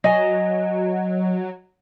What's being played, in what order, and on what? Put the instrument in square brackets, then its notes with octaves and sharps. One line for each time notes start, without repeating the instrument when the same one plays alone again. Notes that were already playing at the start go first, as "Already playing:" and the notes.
[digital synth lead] F#3 [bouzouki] D#5 G#5